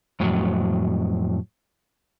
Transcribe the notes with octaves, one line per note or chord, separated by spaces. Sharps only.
F2 A2 F#3